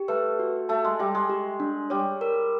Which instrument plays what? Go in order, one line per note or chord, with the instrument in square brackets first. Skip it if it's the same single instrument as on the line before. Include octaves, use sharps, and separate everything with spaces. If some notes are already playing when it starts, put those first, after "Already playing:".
Already playing: [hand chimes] G4
[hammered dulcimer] A3 [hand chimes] B4
[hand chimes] F#4
[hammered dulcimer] A3 [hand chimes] A5
[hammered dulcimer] G#3
[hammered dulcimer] G3 [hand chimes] E5
[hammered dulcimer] G#3
[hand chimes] G4
D4
[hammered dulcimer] G3 [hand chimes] C#5
[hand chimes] A#4